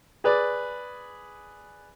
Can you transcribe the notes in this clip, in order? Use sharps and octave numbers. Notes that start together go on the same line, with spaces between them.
G#4 B4 D5